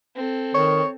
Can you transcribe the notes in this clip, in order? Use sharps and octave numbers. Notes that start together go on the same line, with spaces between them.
C4 A4
D#3 C#5